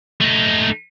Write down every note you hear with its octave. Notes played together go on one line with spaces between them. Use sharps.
A3 D#4